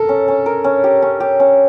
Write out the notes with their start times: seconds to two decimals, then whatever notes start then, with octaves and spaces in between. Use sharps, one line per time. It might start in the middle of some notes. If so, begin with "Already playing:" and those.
Already playing: A4 A#4
0.09 C#4
0.28 C#4
0.46 A#4
0.64 C#4
0.84 G4
1.02 C#4
1.20 G4
1.40 C#4